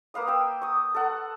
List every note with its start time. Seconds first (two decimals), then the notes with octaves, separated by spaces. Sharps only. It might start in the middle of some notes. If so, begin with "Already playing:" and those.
0.14 A#3 B4 F5 D#6
0.27 G5 E6
0.62 C#6 D#6
0.95 A4 F#5